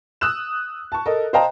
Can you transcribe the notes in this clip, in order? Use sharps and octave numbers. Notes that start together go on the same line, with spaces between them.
D#6 E6 F#6 E7
A5 C#6
A4 A#4 D#5
C5 D#5 F5 G5 A5 A#5